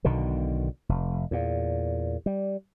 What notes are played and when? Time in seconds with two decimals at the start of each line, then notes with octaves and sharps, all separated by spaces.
0.05 B1 B2 D3 D#3
0.89 F1
1.31 E2 A#2
2.26 G3